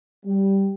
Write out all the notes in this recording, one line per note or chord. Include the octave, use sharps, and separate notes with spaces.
G3